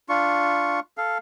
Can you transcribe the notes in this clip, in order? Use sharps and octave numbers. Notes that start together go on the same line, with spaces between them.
D4 F4 C#6
A4 F5